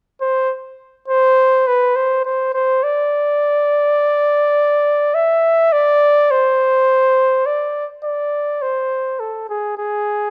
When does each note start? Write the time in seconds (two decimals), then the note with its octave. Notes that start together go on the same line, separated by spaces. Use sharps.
0.21 C5
1.08 C5
1.67 B4
1.96 C5
2.25 C5
2.54 C5
2.83 D5
5.15 E5
5.72 D5
6.31 C5
7.46 D5
8.04 D5
8.62 C5
9.20 A4
9.50 G#4
9.78 G#4